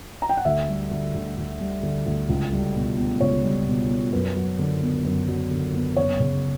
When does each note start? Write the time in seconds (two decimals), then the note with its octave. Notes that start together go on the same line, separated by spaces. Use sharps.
0.22 A#5
0.29 G5
0.37 F#5
0.45 D2 E5
0.68 G3
0.91 D3
1.14 D2
1.37 D2
1.60 G3
1.83 D3
2.06 D2
2.29 C#2
2.52 G3
2.75 B2
2.97 B3
3.21 C#2 C#5
3.44 G3
3.67 B2
3.90 B3
4.12 F#2 B4
4.36 F#3
4.59 D3
4.82 B3
5.05 F#2
5.28 F#3
5.51 D3
5.74 B3
5.97 F#1 C#5
6.20 C#3